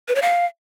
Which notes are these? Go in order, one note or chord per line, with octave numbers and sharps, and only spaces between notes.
B4
C#5
F5